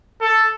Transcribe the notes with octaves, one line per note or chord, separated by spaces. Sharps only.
A4